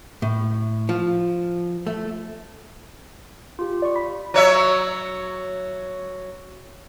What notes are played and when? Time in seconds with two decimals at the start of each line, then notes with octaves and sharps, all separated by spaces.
0.22 A2
0.89 F3
1.87 A3
3.59 F4 G4
3.82 D5 C#6
3.96 B5 B6
4.34 F#3 C#5 E5